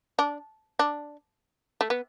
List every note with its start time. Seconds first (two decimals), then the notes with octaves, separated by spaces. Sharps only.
0.19 D4
0.79 D4
1.81 A3
1.90 B3